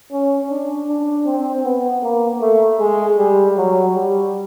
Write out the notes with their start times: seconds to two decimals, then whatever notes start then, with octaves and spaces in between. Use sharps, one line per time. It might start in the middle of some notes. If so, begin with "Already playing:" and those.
0.12 C#4
0.51 D4
0.88 D4
1.26 C4
1.64 B3
2.03 A#3
2.41 A3
2.79 G#3
3.18 G3
3.57 F#3
3.95 G3